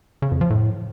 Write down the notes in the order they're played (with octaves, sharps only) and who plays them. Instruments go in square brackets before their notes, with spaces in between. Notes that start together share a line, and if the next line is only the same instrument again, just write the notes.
[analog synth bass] C#3
F2
F3
A2